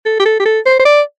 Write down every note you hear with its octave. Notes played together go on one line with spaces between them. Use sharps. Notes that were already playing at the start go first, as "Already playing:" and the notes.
A4
G4
A4
G4
A4
C5
C5
D5